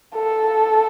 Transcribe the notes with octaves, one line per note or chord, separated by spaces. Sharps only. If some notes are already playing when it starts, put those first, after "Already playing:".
A4